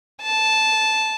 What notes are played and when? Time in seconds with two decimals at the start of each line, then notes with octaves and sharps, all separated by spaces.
0.22 A5